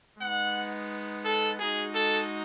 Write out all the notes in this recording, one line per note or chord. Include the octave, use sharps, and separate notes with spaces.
G#3 B3 D#4 F#5
A4
G#3 D#4 F#4 G#4
A4